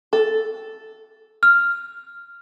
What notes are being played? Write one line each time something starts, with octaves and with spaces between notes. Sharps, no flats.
A4
F6